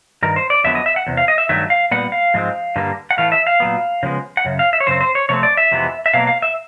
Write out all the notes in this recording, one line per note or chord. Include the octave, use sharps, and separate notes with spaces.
G2 D#3 A#4
C5
D5
F2 D3 F#3 B3 E5
D#5
E5
F#5
E2 C3
F5
D#5
E5
G2 D#3 F#3 A3 E5
F5
A#2 G3 B3 F#5
F5
G#2 F3 G#3 C4
G2 D3 G3 A#3
F#5
A2 E3 A3 F5
E5
F5
A#2 F#3 B3
C#3 F3 G#3 B3
F#5
F#2 C#3
F5
E5
C#5
F#2 C#3 C4 C5
C5
C#5
C3 F3 A3 C4 C#5
D5
E5
F2 C3 E3 G#3 B3
E5
B2 F#3 A#3 F5
F5
E5